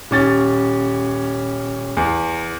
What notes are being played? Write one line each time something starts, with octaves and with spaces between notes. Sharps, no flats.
D#1 C#4 A6
E2